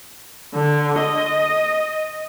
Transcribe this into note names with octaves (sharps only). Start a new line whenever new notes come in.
D3
D#5